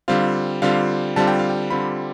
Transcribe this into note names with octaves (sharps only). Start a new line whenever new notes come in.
D3 G3 C4 F4 F5
D3 G3 C4 F4 F5
D3 G3 C4 F4 A5
G5
F5
G5
D3 G3 C4 F4 B5